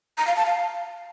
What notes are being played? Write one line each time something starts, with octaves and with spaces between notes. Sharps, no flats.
A#5
F5
A5
F5